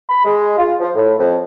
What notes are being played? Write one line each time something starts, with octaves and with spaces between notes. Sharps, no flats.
B5
G#3
F4
F3
A2
F2